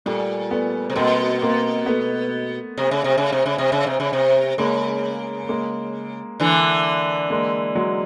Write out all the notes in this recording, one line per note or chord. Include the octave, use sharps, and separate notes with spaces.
A#2 G3 A3
A3 B3
C3
B2 A#3 C4
A#3 C4
A3 B3
C3
C#3
C3
C#3
C3
C#3
C3
C#3
C3
C#3
C3
C#3 G#3 A#3
G#3 A#3
D3 E3
G#3 A#3
F#3 G#3